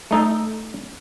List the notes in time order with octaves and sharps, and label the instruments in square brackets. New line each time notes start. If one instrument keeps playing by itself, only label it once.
[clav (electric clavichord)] A3 D#4 A4